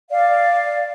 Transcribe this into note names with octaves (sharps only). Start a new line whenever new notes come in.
D5 F5